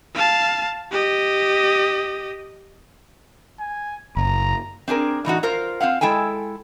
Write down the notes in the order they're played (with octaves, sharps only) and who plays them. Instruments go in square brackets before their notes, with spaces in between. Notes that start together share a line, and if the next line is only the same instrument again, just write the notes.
[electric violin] F5 A5
G4 D#5
[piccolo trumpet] G#5
[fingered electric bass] F#1 [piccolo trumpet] A#5
[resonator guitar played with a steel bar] C4 D4 G#4 A#4
A2 E3 D#4 F#4
F4 A#4 C5
C4 F4 F5 F#5
G#3 E4 A4 G5 G#5